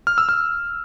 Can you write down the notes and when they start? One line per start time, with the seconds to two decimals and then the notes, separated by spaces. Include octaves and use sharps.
0.07 F6
0.18 E6
0.29 F6